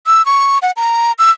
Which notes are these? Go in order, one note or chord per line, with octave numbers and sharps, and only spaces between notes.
E6
C#6
F#5
A#5
E6